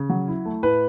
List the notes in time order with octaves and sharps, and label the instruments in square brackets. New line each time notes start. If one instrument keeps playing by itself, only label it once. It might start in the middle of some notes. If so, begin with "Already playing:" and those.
Already playing: [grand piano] C#3
F#3
E4
A3
[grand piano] A2 [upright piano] B4